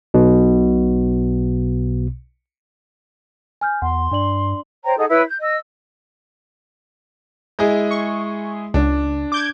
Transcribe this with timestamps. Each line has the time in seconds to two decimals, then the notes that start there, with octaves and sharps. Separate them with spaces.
0.14 B1 B2
3.61 G#5 F6 G6
3.82 E2 F#5 C6
4.11 G2 D4 D5 F#7
4.84 C5 C#5 G5 A#5
4.97 D#4 G#4 A4 F#5
5.09 E4 B4 C#5 E6
5.28 G6
5.40 D#5 E6
7.59 G#3 E4 G#4
7.91 C#6
8.74 C#2 D4
9.32 D6 G6 G#6